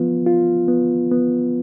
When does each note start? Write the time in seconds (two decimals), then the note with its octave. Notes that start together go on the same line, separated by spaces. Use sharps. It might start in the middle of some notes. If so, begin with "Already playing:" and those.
Already playing: F3 B3 F4
0.27 F4
0.68 B3
1.12 B3